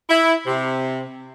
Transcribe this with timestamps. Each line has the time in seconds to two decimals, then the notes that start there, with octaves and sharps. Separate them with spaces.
0.08 E4
0.46 C3